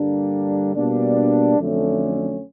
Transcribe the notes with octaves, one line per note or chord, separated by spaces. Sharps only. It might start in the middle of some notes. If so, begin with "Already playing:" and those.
Already playing: G2 D3 G3 A#3 D4
B2 G3 A#3 D4
F2 D3 F#3 A3 C#4